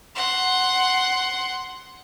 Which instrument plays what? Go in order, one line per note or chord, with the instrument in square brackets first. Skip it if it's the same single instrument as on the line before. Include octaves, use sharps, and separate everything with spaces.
[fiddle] F#5 C6